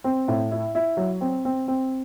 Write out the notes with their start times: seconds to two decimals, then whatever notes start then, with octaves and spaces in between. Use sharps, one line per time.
0.04 C4
0.28 A2
0.51 E4
0.75 E4
0.97 F#3
1.21 C4
1.45 C4
1.68 C4